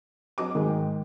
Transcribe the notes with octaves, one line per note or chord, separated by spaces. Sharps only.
F#3 D#5 D6
G#2 D#3 G#3
G5